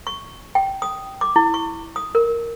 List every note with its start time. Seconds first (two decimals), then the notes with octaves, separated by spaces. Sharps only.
0.07 C#6
0.55 G5
0.82 D#6
1.21 D6
1.36 E4
1.54 C#6
1.96 D#6
2.15 A#4